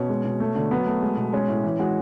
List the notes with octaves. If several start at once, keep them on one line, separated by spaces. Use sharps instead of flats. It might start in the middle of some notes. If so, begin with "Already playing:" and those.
Already playing: B2 C#4
G#3
B2
A3
D3
F#3 B3
A3
G#3
B2
G#3 C#4
A2
E3
G#3 F#4